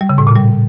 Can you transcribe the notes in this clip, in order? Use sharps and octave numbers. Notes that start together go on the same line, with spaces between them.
G3
C#3
A2
A#2
G3